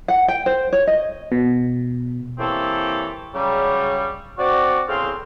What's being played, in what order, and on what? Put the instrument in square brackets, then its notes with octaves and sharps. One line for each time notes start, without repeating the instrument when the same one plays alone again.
[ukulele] F#5
G5
C5
C#5
D#5
[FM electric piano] B2
[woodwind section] E3 A#3 C4 G4 A4 C#5
C#3 F#3 G3
C4 F#4 D5
E2 A2 C#3 C4 F5 C6